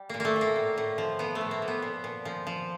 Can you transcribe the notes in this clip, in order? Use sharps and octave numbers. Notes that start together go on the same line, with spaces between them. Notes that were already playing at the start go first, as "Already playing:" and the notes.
Already playing: G3
A#2 A#3
A3 A#3
A#2
A#3
A2
A2
F3
F3 B3
A3
A2
A#3
F3
B3
A#2
A#2
F3
F3